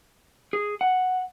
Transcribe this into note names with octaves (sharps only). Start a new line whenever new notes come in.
G#4
F#5